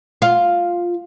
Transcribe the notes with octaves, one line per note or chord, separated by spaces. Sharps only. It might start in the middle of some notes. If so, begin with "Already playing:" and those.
F4